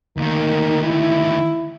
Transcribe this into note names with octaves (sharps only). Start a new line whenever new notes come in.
D2 D#3 A#3 D#4
E4